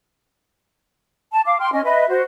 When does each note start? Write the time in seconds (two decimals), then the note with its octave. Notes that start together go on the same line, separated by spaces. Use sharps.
1.32 A5
1.45 F5 D6
1.59 G5 C6 F6
1.72 C#4 D#5 F6
1.84 B4 D#5 E5
2.09 F#4 C5